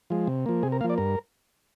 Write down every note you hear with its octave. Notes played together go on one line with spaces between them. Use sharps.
F3 G#3
C3
F3 A#3
C3 G#4
A#4
F3 A#3 F5
D5
G2 A#4